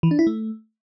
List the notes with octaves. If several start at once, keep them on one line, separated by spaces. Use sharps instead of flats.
E3
D4
E4
A3